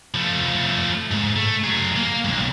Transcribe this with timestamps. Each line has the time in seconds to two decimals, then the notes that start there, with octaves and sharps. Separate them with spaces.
0.14 F3 A3
1.11 G#2
1.36 A3
1.64 F#3 G#4
1.96 A#3
2.24 B1 G2